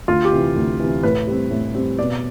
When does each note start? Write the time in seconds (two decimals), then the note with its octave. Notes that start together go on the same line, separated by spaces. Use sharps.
0.08 D2 F4
0.24 G4
0.32 C3 E3
0.56 D2
0.80 C3 E3
1.03 A2 B4
1.27 G3 C4
1.51 A2
1.74 G3 C4
1.98 B2 D5